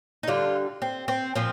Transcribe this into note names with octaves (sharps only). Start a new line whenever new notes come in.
D#4
D3 G3 F4
C4
C4
A#2 F3 C4